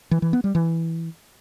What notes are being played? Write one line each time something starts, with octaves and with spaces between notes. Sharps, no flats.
E3
E3
B3
G3
E3